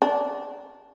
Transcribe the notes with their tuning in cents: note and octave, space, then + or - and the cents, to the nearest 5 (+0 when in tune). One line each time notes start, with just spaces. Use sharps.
D4 -15